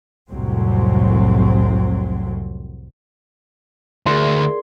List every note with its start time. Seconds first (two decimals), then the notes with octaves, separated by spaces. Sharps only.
0.30 C2 F2 A2 C3 F#3 C4
4.06 D2 G#4 A#4 D5 C6